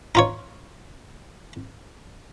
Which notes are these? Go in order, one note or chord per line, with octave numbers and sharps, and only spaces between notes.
D#4 F4 C#5